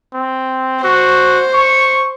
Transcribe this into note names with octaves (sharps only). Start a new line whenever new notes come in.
C4
F#4 C5
C#6